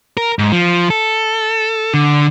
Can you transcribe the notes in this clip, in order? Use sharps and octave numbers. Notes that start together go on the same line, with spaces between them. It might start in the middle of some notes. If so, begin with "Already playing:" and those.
A#4
G#2
F3
A4
D3